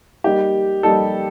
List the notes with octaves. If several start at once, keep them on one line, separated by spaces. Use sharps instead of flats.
G3 A#3 D#4 G4
G3 A#3 D#4 A4